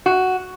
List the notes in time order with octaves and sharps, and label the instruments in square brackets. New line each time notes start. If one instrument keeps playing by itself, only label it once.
[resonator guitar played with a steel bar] F#4